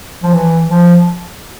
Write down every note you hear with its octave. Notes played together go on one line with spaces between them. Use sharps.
F3
E3
F3